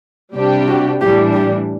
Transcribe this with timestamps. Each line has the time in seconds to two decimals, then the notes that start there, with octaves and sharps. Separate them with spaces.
0.35 C3 G3 D4 G4
0.68 F#4
1.00 A2 E3 G3 D4 G4
1.33 G4